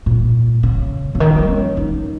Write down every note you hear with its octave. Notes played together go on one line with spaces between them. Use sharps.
A#2
C#3
C#3
D#3
F3
C#4
D#4